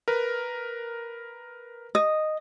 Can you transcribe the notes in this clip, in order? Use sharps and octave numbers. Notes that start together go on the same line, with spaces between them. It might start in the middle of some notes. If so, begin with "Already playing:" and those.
A#4 B4
D#5